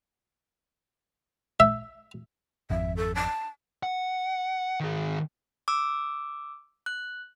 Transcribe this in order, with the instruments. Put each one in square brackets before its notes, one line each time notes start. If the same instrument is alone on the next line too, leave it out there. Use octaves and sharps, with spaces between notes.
[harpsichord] E5
[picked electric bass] G#1 F2 [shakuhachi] E5
[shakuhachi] A4
A5
[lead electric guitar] F#5
D#3 G#4
[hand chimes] D6 E6
F#6